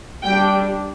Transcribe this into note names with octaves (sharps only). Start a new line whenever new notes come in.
G3 D4 G5